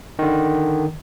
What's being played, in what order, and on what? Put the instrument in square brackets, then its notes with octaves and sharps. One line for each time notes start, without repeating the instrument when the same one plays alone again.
[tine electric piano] D3 D#3